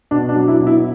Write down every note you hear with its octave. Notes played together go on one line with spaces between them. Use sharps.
B2 D4
D4
F#3
E4
B2
E4